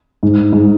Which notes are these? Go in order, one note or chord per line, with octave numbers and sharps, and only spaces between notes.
G#2
G#2